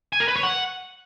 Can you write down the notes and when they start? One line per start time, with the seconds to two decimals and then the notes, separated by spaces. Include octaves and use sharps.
0.13 G#5
0.20 A#4
0.28 B4
0.36 C#5
0.43 F#5